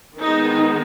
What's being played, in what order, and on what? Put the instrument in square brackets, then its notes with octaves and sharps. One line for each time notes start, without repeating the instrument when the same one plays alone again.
[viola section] D#3 G#3 B3 D#4